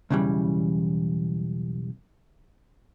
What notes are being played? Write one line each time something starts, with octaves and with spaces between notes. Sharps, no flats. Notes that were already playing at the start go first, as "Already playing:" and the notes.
B1 E2 C#3 E3 G3